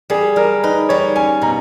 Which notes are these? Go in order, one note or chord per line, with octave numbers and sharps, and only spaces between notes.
G3 G#4
G3 A#4
D#4 B4
G3 C#5
C#4 G#5
B2 A#5